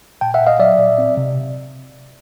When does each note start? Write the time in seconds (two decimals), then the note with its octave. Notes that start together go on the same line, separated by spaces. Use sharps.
0.21 A#2 G5 A5
0.34 E5 F#5
0.41 A#2
0.47 D#5 F5
0.59 F#3 D5 E5
0.79 A#2
0.98 C4
1.17 C3